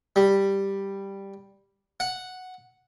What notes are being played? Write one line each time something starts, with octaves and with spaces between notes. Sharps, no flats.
G3
F#5